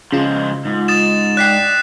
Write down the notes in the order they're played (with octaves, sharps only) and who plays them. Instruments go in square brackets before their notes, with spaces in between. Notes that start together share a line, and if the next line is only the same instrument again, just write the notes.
[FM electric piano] C#3 F4 [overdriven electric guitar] F3 G#3
[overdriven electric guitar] G#2
[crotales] D#6 A6 E7
[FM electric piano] D5 G5 [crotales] F#6 B6 C7